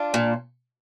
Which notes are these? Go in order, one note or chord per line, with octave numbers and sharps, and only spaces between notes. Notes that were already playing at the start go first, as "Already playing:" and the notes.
Already playing: D4 F4
A#2